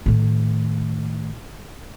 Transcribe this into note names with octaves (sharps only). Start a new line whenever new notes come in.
A2 D#3